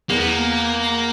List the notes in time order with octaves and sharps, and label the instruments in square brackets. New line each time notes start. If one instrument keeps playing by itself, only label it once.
[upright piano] E2 [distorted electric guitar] A#3
[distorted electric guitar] B3
A#3